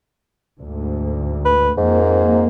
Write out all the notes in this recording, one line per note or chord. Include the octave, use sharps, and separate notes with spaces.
D2 G#2
B4
F2 G#2 A#3